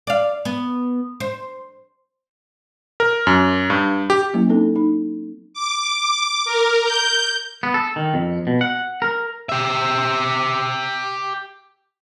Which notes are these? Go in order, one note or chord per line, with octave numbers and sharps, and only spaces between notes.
D5 F5
B3
C5
A#4
F#2
G2
G4
F#3 A#3 C#4 E4
C4 D#4 A4
D#4
D6
A#4
G6
B3
A4
D#3
F2
B2
F#5
A#4
G4 E5